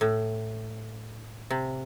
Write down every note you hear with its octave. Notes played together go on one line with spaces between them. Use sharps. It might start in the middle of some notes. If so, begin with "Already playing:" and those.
A2
C3